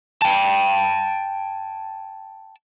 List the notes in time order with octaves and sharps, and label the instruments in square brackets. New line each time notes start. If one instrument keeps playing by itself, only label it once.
[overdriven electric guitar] G5 A5